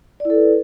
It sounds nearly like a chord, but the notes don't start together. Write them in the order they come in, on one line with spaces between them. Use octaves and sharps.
D5 E4 A4 B4